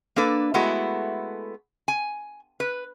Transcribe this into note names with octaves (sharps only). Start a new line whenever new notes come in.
A#3 D4 A4 B4
G#3 A3 B3 E4 F#4 A4
G#5
B4